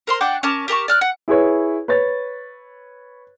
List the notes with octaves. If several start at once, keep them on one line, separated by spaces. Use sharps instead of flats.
A#4 C5 C6
D4 F#5 G5 D6
C#4 A#4 A5 D6
G4 A#4 A5 C#6
D5 F6 F#6
F#5
E4 G#4 B4 C#5
B4 C#5 A6